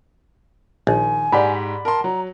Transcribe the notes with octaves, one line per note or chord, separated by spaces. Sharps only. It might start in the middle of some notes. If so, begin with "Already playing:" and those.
A#1 D#3 G#5
G#2 G4 D5 F#5 B5
A#4 A5 C6
F#3 A#5